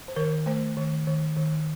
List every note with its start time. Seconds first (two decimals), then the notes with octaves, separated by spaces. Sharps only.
0.08 C5
0.16 D#3 A#4
0.46 A3 C5
0.77 D#3
1.07 D#3
1.37 D#3